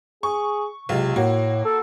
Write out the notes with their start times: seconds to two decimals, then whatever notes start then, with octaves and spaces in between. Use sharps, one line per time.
0.23 G#4 C#6
0.89 B1 C3 G#3 F4
1.16 A2 A#3 F#4
1.65 A4